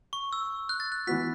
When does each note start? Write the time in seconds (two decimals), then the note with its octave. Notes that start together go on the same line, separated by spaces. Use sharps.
0.13 C#6
0.33 E6
0.69 F#6
0.80 A6
0.92 F#6
1.07 E3 B3 F#4 F#6 B6